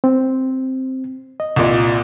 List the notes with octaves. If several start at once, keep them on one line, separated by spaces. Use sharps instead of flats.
C4
D#5
C2 A#2